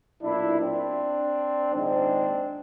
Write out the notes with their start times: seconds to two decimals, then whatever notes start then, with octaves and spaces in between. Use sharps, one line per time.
0.22 B1 A#2 D4 E4
0.60 C4 D4
1.73 A#1 G#2 D#3 C4 D4